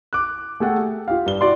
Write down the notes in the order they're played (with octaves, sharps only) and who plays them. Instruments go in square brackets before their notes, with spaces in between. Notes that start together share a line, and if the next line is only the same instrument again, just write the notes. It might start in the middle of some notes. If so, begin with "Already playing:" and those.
[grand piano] D6 F#6
A3 G#4 A4 F#5 G5
G4
F4 G4 F5
G2 G7
E4 F#4 D5 C6